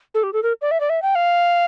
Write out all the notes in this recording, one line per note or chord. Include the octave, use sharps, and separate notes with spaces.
A4
G4
A4
A#4
D5
E5
D5
E5
G5
F5